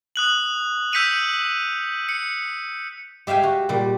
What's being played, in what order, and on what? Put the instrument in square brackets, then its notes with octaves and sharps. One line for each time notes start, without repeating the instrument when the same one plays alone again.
[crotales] D#6 F#6 F#7
E6 G6 B6 C#7 D#7 F7
C#7
[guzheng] G4 E5 F5 G5 G#5
F#4
A#2 G3